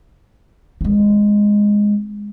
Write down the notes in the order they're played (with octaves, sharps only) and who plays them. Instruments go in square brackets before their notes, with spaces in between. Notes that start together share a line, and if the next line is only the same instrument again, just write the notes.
[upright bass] G#3 C4